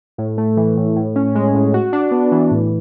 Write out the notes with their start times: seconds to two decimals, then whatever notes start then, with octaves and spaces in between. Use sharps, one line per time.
0.18 A2
0.37 A3
0.57 E3
0.77 A2
0.96 A2
1.15 C#4
1.35 G#3
1.54 A2
1.74 F#4
1.92 D4
2.11 B3
2.32 E3
2.51 A2